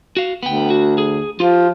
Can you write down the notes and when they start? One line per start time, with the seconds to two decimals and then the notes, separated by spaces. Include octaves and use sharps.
0.17 F#4 F5
0.43 D2 B3 G5
0.70 F#4
0.98 G#4
1.40 F3 F4 G4